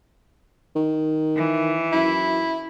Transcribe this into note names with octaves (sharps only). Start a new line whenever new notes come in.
D#3
E3
F#2 E4